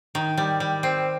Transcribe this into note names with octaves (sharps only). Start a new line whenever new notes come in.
D#3
G3
G3
C4